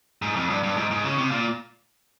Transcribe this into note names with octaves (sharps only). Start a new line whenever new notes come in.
G#2
F2
G2
G2
G#2
G#2
C#3
C3
A#2